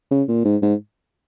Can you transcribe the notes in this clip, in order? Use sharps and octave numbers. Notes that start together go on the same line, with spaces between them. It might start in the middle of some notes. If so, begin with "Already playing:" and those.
C#3
A#2
G#2
G#2